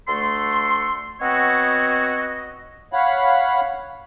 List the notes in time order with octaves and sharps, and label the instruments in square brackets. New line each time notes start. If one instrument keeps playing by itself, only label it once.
[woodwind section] D2 A3 A4 C6
B3 C4 F#4 C#5 D#5
[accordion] C#5 F5 F#5 B5